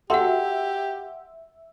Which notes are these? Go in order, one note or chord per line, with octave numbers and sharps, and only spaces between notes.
F#4 G4 A4 E5 F#5 C6 E6